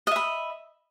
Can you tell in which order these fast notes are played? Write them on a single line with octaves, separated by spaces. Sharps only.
D#5 E5 B5